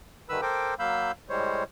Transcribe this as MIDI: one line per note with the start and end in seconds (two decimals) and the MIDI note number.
0.29 0.41 43
0.29 0.41 50
0.29 0.41 51
0.29 0.41 71
0.29 0.41 83
0.29 0.41 88
0.42 0.74 69
0.42 0.74 70
0.42 0.74 72
0.42 0.74 79
0.42 0.74 86
0.79 1.12 54
0.79 1.12 58
0.79 1.12 77
0.79 1.12 83
0.79 1.12 88
0.79 1.12 91
1.29 1.64 45
1.29 1.64 55
1.29 1.64 56
1.29 1.64 72
1.29 1.64 73